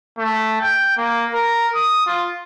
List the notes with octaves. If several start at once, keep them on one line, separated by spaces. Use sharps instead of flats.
A3
G5
A#3
A#4
D#6
F4